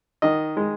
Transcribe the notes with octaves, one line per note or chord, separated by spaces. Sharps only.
D#3 D#5
G#3